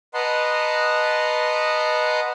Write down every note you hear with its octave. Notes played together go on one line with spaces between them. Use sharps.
B4 D#5 F#5 A5 A#5 C6